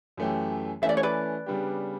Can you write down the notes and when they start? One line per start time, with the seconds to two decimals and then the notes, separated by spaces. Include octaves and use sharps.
0.17 F#2 E3 A3 C#4 G4
0.82 E3 A3 C#4 E5
0.89 D5
0.97 C#5
1.03 B4 D5
1.46 C#3 G3 B3 D4 G4